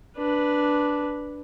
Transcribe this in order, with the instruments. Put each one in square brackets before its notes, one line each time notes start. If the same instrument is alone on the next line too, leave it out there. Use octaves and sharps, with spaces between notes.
[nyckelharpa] D4 B4